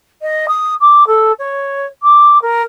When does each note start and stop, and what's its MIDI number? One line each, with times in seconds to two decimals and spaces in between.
0.22 0.46 75
0.48 0.74 87
0.80 1.06 86
1.07 1.32 69
1.39 1.86 73
2.03 2.41 86
2.42 2.62 70